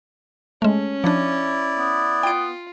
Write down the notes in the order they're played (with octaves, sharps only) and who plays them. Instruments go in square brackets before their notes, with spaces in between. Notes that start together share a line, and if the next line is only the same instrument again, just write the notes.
[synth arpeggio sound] G#3 A3 [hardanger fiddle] C#4
[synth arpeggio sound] F3 D4 [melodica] E4 D5
[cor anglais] B3
[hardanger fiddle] F4 [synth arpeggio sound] G5 D7